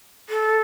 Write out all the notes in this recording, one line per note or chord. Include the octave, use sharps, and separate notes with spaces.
A4